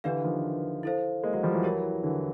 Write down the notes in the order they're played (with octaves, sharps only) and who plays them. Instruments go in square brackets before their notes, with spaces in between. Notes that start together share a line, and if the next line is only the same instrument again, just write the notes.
[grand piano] D3 E3 [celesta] D4 G4 B4 D5 F5
[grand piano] D#3 F3
[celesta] E4 A4 C5 F5
[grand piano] G#3 A#3
F#3 G#3
F3 G3
E3 F#3
[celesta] E4 G4 A#4 C#5
[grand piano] D3 E3